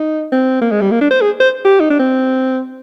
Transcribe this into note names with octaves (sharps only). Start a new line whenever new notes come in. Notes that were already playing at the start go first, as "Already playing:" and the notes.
Already playing: D#4
C4
A#3
G#3
G3
A#3
D4
C5
G#4
C5
G4
D#4
D4
C4